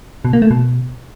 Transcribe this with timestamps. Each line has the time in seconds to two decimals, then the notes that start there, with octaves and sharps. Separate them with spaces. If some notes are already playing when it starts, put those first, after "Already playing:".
0.25 B2
0.33 A#3
0.42 A3
0.51 B2